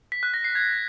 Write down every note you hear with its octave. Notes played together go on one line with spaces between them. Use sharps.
B6
F#6
A#6
C7
G#6